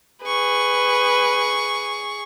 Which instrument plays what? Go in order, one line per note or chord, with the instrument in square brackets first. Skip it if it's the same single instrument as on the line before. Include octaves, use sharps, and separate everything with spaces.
[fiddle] G#4 C#6 [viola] B4